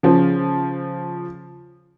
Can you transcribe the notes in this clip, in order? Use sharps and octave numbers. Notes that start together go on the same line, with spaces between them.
C#3 F3